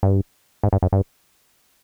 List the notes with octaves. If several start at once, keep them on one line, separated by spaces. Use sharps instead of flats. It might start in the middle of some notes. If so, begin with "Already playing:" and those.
G2
G#2
G2
F#2
G2